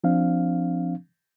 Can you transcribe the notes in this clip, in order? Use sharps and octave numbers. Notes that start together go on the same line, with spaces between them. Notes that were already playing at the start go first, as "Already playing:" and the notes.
F3 C4 D4 F5